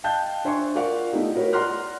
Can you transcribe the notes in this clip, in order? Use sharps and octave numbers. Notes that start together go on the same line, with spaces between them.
D#5 F5 G5 A5 F#6 G6
D4 C5 E5 G#5 C6 C#6
F4 A#4 D5 F5 F#5 C#6
A3 B3 D#4 E4 G4
F4 F#4 A#4 B4 C#5
D5 F#5 A#5 C6 F6 F#6